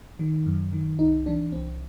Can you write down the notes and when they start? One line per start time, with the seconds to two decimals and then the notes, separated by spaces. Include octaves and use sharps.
0.19 D#3
0.46 F#2
0.73 D#3
0.99 C2 D#4
1.26 C3 E3 D4
1.52 C2 C4